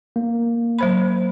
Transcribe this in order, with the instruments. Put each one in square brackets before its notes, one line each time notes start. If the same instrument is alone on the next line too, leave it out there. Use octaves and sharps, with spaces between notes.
[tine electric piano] A#3
[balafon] F#3 C5 B5